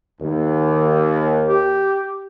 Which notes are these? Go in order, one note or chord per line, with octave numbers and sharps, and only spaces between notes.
D#2
G4